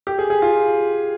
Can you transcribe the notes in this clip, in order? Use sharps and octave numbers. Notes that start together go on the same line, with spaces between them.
G4
G#4
G#4
F4